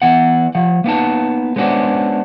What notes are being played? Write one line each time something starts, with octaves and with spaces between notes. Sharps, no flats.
E3 B3 F#5
F3 F#5
A#3 B3 D#4 A5
G#3 B3 C#4 D4 F#4 C5